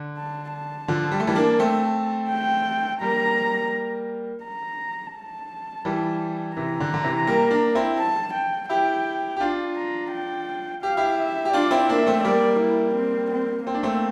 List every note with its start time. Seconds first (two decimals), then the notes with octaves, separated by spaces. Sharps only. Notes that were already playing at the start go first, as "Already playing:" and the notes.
Already playing: D3
0.18 A5
0.53 A5
0.88 D3 F3
1.11 G3
1.20 A3
1.27 E3 G3
1.35 A#3 D4
1.59 A3 C4
2.30 G5
3.01 G3 A#3 A#5
4.44 A#5
5.15 A5
5.85 E3 G3
6.56 C3 E3 A#5
6.80 D3
6.94 D3
7.04 C3 E3
7.27 G3 A#3
7.51 A#3 D4
7.75 C4 E4
7.99 A5
8.34 G5
8.69 E4 G4 G5
9.36 G4
9.40 D4 F4
9.76 A#5
10.11 G5
10.83 G4 F5
10.97 E4 G4
11.18 E5
11.45 G4
11.53 D4 F4 D5
11.71 C4 E4
11.89 A#3 D4 E5
12.07 A3 C4
12.24 G3 A#3 D5
12.60 E4
12.95 C4
13.31 C4
13.66 A#3 C4
13.74 D4
13.83 A3 C4